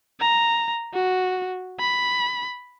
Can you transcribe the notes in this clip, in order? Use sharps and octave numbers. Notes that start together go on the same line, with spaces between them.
A#5
F#4
B5